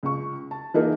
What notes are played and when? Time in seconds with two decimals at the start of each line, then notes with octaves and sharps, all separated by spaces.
0.03 C#2 C#6
0.51 A5
0.74 E3 A#3 D#4 F4 G#4 A#4